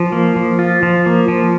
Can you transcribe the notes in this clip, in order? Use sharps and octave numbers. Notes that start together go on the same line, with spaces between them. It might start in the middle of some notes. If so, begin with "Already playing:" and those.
Already playing: F3
A#3
F3
F4
F3
A#3
F3